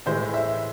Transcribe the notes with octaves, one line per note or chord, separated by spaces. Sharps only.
A2 E3 G#3 C5
E5